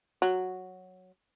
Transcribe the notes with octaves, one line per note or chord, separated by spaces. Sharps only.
F#3